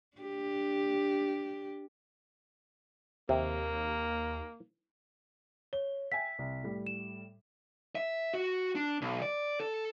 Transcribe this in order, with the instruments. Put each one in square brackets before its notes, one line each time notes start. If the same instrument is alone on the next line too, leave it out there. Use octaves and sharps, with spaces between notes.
[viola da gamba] D4 G4
[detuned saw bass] D#2 [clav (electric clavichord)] C3 [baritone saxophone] A#3
[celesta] C#5 [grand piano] G7
[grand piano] E5 G5 G#5 [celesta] B6
[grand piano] C2
A2 G3
[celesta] E7
[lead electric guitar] E5
F#4
D4
B1
D5
A4